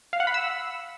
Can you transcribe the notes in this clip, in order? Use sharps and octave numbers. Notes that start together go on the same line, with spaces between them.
F5
F#5
B5
E6